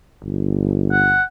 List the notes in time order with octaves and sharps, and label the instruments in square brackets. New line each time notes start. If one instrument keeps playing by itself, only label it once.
[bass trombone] G1
[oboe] F#5